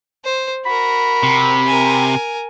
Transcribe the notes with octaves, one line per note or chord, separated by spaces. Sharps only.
C5
F#4 A#4 B5
C3
A#4 G#5